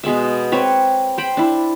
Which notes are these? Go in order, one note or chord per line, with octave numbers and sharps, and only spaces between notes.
B2 G#3 B3 E5
C4 B4 C#5
C5 G5 B5
D4 E4